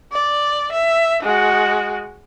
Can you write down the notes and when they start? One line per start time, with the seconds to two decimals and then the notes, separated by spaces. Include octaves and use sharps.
0.12 D5
0.72 E5
1.23 G#3 F#4